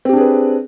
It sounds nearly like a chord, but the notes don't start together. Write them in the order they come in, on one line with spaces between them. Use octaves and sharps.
C4 G4 D4 G#4 B4